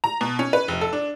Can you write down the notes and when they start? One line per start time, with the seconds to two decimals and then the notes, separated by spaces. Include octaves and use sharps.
0.04 A#5
0.21 B2
0.39 C#4
0.53 B4
0.68 F1
0.81 A4
0.93 D4